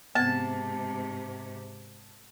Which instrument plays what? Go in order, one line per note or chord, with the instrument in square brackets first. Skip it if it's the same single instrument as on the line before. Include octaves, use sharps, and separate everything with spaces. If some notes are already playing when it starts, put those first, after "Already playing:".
[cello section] G#2 C3 [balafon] B3 C4 [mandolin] A5